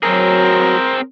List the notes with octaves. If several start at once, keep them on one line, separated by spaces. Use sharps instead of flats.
F#3 C4 G#4 A#4